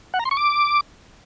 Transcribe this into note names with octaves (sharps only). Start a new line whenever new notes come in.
F#5
A#5
C6
C#6
D6